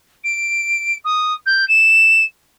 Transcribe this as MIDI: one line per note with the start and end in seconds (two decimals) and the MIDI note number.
0.24 0.96 98
1.04 1.33 87
1.46 1.67 91
1.68 2.23 100